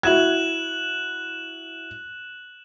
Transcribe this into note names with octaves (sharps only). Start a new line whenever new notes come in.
E4 F#4 F#6 G#6 E7 F#7